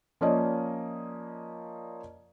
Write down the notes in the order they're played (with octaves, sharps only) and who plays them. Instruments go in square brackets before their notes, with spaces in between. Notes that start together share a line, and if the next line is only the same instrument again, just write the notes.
[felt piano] F3 A#3 C#4 D5 D#5